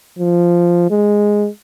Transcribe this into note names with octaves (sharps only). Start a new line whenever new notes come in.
F3
G#3